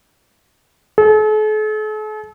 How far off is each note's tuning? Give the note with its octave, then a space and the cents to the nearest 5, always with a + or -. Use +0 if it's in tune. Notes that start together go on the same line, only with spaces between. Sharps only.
A4 -45